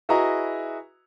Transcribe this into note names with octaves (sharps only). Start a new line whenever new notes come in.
E4 F#4 G#4 B4 D#5 A#5